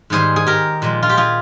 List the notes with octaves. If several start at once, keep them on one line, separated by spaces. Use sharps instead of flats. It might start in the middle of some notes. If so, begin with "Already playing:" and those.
G#2 D#3 G3 G#4 C5
G#4
G4 A#4
A#2 F3 G#3
F4
G4
F4 G#4